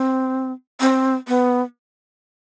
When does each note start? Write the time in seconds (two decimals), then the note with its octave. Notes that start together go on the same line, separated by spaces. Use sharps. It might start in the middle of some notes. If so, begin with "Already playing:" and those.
Already playing: C4
0.80 C4
1.28 B3